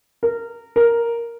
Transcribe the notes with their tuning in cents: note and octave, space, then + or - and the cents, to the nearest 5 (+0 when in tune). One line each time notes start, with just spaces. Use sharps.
A#4 -20
A#4 +0